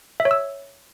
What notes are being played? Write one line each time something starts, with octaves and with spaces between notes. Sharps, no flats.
E5
C#5
E6